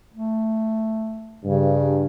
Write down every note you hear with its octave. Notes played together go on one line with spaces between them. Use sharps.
A3
G2 C#3